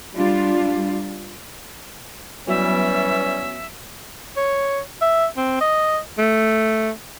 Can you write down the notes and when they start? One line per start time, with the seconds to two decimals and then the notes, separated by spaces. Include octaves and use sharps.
0.15 G3 D4 F4
2.48 E3 F#3 G3 B3 C#4 E5
4.37 C#5
5.02 E5
5.37 C4
5.61 D#5
6.18 A3